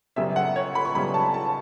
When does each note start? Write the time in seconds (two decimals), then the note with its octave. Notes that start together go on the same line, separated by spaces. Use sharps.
0.16 F#2 C#3 G3 B3 E5
0.36 F#5
0.56 C#5
0.75 B5
0.85 C#6
0.95 F#2 C#3 G3 B3 B5
1.14 A5
1.34 A5